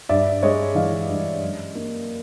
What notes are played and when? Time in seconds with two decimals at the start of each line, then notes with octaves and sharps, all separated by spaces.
0.09 G2 D5 E5
0.42 G#3 C#5 D#5
0.75 E3 D#5 F5
1.09 G2
1.42 F#2
1.75 A#3